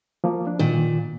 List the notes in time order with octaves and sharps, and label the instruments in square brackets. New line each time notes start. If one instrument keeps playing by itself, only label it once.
[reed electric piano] F3 A#3
D4
[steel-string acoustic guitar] A#2 [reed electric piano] D#3